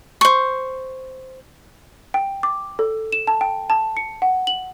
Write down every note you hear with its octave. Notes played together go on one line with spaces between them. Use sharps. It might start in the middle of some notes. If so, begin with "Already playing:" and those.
C5 C#6
G5
D6
A4
E7
A5
G5
A5
C#7
F#5
F#7